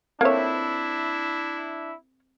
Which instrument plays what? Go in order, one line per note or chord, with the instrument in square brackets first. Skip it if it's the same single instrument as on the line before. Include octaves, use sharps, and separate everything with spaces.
[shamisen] A#3 C#5 [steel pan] C4 A4 E5 [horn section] D4 E4